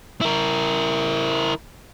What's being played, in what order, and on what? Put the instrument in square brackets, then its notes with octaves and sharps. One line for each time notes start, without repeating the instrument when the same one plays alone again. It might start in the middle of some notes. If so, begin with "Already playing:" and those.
[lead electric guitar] E4 A#4